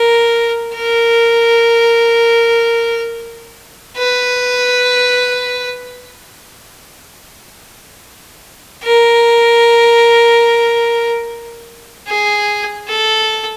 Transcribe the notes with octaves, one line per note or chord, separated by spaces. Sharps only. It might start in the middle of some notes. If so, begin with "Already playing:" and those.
Already playing: A#4
A#4
B4
A#4
G#4
A4